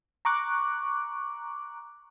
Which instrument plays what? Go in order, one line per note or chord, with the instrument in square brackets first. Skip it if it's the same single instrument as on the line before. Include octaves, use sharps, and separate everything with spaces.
[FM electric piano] A#5 C#6 D6 F#6